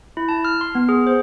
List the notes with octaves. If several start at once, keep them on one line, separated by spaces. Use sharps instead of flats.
E4
A5
F6
C6
B3
G#4
C5